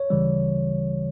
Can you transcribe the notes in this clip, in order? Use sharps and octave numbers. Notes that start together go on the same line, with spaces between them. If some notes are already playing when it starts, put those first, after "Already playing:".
Already playing: C#5
D2 C#3 E3 G3